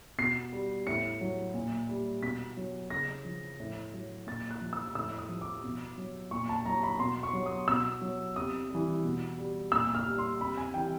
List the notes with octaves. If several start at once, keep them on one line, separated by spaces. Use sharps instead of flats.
B2 C7
G3
A2 C#7
F#3
A#2
G3
B2 B6
F#3
C#3 A#6
F3
A2
F#3
A#2 A6
F#6
F3
E6
A2 E6
D#6
F3
D6
B2
F#3
A#2 C#6
A5
F#3 A#5
B5
B2 C6
C#6
F#3
D#6
B2 E6
F#3
C3 D#6
G3
E3
B2
G3
A#2 E6
F6
G3
C6
C3 B5
G#5
E3 G3 G5